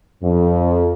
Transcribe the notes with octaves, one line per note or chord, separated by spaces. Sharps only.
F2